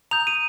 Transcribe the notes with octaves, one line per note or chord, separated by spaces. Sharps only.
A#5 D#6 G6 F7
D#7